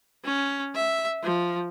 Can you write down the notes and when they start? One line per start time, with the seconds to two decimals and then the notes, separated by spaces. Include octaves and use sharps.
0.25 C#4
0.75 E5
1.23 F3